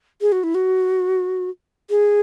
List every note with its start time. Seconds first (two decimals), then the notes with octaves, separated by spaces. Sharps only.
0.21 G#4
0.32 F#4
0.44 E4
0.55 F#4
1.90 G#4